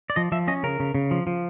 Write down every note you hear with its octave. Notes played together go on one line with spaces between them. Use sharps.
D5
F3 D#5
F3 E5
C#4 D#5
C#3 A#4
C#3
C#3
F3
F3